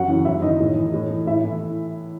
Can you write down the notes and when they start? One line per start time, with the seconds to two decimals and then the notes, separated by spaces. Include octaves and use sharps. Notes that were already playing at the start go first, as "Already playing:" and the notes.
Already playing: F#2 F#4 F#5
0.08 C#3 E3
0.25 F#2 E4 E5
0.42 D#3 D#4 D#5
0.60 A2
0.76 E3
0.94 A2
1.10 E3
1.26 A2 E4 E5
1.44 E3